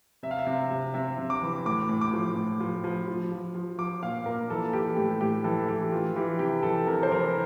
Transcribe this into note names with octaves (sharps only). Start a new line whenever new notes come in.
C3 E5
F5
E5
C3
C3
C3 E5
C3
D6
E3
A2 D6
A2
D6
F3
A2
F3
F3
F3
F3
F3
F3 D6
A#2 F5
A#2 A#4
E3 A4
E3 G4
A2 G4
A2 G4
E3 A4
E3 G4
E3 F4
E3 G4
C3 G4
E3 A4
C3 A#4
C5
E3 A#4